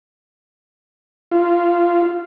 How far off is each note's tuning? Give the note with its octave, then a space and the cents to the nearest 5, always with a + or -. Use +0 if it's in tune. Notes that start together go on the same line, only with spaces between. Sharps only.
F4 -15